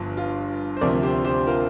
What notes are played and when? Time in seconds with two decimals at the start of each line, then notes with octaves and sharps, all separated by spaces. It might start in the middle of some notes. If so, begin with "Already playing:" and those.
Already playing: G1 G2 F3
0.17 F4
0.77 C5
0.81 D2 C3 F3 A#4 D5
1.03 G4 C5
1.25 G4 C5
1.47 F4 A#4